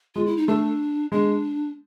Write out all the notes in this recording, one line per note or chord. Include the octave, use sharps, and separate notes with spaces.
G#3 F4
E4
D#4
A3 D4
G#3 D4